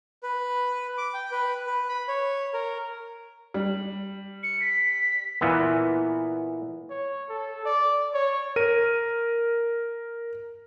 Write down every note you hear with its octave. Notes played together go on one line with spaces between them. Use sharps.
B4
D6
G5
B4
B4
B5
C#5
A#4
G3
C#7
B6
A#2 E3 B3
C#5
A4
D5
C#5
A#4 D#7